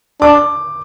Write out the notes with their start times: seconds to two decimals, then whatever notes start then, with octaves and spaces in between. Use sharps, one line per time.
0.21 D4 D6